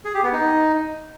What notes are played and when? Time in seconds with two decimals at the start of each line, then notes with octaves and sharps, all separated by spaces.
0.05 G#4
0.14 G4
0.23 B3
0.32 D#4